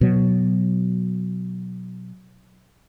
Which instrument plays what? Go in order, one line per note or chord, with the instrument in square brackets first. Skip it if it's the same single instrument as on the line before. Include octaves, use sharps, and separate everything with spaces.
[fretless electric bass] B2 F#3